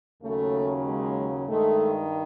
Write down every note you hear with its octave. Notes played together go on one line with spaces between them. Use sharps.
D#2 C#3 F#3 A3
G#3
G2 D#3 G#3 A3